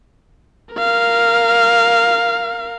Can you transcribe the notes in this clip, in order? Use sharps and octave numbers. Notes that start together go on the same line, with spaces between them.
A#4 F5